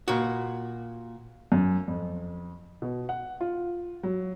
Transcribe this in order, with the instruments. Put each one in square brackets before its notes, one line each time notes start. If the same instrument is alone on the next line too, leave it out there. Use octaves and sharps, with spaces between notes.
[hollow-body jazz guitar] A#2 F#4
[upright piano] F#2
F2
B2
F#5
F4
F#3